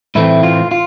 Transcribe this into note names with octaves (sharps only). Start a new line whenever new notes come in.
A2 E3 A3 C4 E4
F4
F4